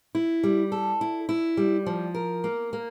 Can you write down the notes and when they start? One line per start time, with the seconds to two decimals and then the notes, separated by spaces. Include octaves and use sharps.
0.15 E4
0.44 G3
0.72 A4
1.01 E4
1.29 E4
1.57 G3
1.86 F3
2.14 A#4
2.44 A#3
2.73 A#3